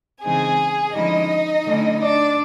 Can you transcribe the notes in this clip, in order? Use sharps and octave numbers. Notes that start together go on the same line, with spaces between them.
C#3 E3 G#3 C4 D#4 G#4 G#5
D3 F3 G#3 C#4 D#4 E4 D#5
D3 F#3 A3 C#4 E4
D4 D5